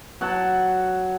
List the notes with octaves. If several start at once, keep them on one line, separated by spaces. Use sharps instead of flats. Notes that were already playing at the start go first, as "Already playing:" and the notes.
F#3 F#5 A5